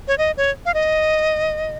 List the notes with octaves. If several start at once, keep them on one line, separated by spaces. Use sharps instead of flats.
C#5
D#5
C#5
F5
D#5